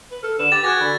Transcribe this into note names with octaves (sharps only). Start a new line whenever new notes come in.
B4
A4 F6
D3 B4 E7
G4 A6
F#4 G#4 D6 F#6 G#6 A#6
D3 B5